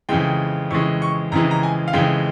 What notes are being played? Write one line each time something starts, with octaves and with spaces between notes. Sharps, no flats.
F2 C#3 E3 G#3 G5
F2 C#3 E3 G#3 C#6
C#6
F2 C#3 E3 G#3 A#5
A#5
G#5
F5
F2 C#3 E3 G#3 G5